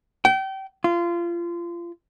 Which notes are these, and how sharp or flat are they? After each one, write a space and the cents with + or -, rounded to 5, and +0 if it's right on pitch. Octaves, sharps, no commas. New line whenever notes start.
G5 -30
F4 -25